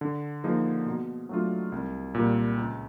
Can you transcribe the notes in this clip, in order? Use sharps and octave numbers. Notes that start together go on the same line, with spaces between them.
D3
F3 A#3 D#4 G#4
B2
F#3 A3 D4 F4
C2
A#2 G3
C#2